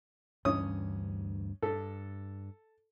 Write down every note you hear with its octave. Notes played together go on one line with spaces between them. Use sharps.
D2 G2 E3 C#4 D#6
G2 A4